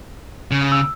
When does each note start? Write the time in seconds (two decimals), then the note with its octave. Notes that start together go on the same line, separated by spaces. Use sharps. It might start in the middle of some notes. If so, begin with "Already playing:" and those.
0.51 C#3
0.72 E6